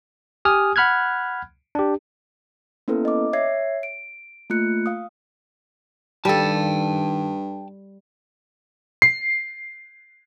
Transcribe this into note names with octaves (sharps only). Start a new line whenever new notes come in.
G4 G#5 D#6 F6
F#5 B5 F6 F#6 G#6
D4 G4
A#3 B3 C#4 E4 A4 B4
D#5 D6
C#5 E5 G#6 C7
D7
A3 A#3 F4 F#6 C#7
F5 D#6
G2 D#3 G3 A4 G5 A5
C7